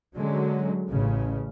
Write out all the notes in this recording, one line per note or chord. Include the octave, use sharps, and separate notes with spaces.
D3 F#3 G#3 C#4
A1 A2 C#3